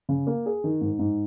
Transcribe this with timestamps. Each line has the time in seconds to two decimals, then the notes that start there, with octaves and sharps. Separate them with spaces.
0.09 C#3
0.27 A#3
0.46 G#4
0.64 D#3
0.81 G#2
0.99 G#2